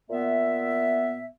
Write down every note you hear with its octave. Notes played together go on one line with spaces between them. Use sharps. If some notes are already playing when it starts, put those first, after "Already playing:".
A#2 B3 E5